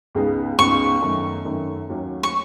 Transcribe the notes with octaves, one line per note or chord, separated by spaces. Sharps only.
C#2 C#3 G#3 B3 D#4
C#2 C#3 G#3 B3 D#4 C#6
F#2 D#3 A3
F#2 D#3 A3
D#2 D#3 F#3 C#4
C#6